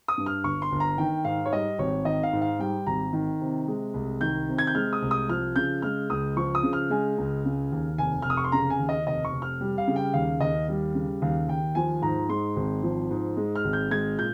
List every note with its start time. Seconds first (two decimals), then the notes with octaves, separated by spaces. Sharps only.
0.08 D#6
0.18 G2
0.26 F6
0.44 G1 C#6
0.62 C6
0.72 G1
0.80 A#5
0.98 D#3 G5
1.25 G#2 F5
1.46 C#5
1.52 G3 D#5
1.79 G#1 C#5
2.05 D#3 D#5
2.23 F5
2.33 G#2
2.42 F5
2.59 G3 G5
2.87 G#1 A#5
3.13 D#3
3.41 C3
3.68 G#3
3.94 C2
4.21 D#3 G6
4.49 C3
4.58 G#6
4.67 G6
4.75 G#3 F6
4.93 D#6
5.02 C2
5.11 D#6
5.29 F3 F6
5.56 C#3 G6
5.82 G#3 F6
6.10 C#2 D#6
6.36 F3 C#6
6.55 D#6
6.63 C#3
6.73 F6
6.90 G#3 G#5
7.18 C#2
7.45 C#3
7.72 D#2
7.98 F1 G#5
8.22 F6
8.25 F1 D#6
8.37 C#6
8.44 C6
8.52 C#3 A#5
8.70 G#5
8.79 D#2
8.89 D#5
9.06 F1 D#5
9.25 C#6
9.33 F1
9.42 F6
9.61 G3
9.78 F5
9.87 C#3
9.96 G5
10.14 D#2 F5
10.41 D#2 D#5
10.68 G3
10.95 C#3
11.22 D#2 F5
11.48 D#2 G5
11.75 F3 G#5
12.02 G#2 A#5
12.29 G#3 C6
12.56 G#1
12.83 F3
13.11 G#2
13.37 G#3
13.55 F6
13.64 G#1
13.73 G6
13.91 G#3 G#6
14.18 A#2 G6